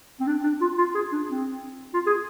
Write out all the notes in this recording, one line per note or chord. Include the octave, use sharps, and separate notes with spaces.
C4
D4
D4
F4
F4
G#4
D4
C4
F4
G#4